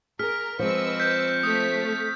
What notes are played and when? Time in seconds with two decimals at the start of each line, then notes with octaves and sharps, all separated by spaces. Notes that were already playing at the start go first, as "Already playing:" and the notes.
0.19 G#4 A#4 F6 B6
0.59 F3 G#3 C4 B4 D#5 C#6 E6
1.00 G6 B6
1.43 A3 D#6 B6